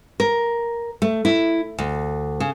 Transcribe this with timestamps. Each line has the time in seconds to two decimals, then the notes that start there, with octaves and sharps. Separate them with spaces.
0.20 A#4
1.02 A3
1.25 E4
1.79 D2
2.40 C#3